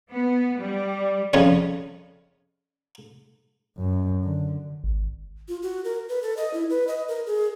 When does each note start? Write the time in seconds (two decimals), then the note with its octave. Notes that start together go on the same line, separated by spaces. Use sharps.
0.11 B3
0.59 G3
1.33 F2 C#3 G3 C#5
3.78 F#2
4.24 D3
4.84 G#1
5.48 F4
5.62 F#4
5.84 A#4
6.09 B4
6.22 A4
6.37 D#5
6.54 E4
6.70 B4
6.88 D#5
7.08 A#4
7.26 G#4